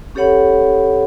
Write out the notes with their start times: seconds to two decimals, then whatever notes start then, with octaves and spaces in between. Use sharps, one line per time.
0.15 C#4 G4 A4 C#5 F#5 B5